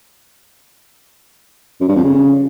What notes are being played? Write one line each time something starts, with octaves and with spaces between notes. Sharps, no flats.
F#2
G2
F2
C#3